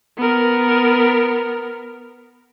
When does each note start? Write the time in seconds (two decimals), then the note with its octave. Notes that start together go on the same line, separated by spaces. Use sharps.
0.17 B3 A#4